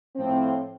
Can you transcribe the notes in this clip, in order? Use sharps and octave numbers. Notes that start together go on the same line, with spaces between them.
A2 F3 C4